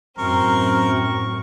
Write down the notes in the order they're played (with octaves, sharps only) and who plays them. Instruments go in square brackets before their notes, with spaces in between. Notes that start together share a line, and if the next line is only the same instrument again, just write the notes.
[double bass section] F#2 A2 [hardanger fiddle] C4 [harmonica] A#4 [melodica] C#6